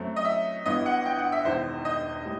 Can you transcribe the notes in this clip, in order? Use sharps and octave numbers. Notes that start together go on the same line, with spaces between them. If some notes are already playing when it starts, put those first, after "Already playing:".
Already playing: F#2 F#3 A3 C4
D#5
E5
G1 G2 E3 B3 D#5
F#5
G5
F#5
E5
E1 E2 D#3 C5
D#5
A2 G3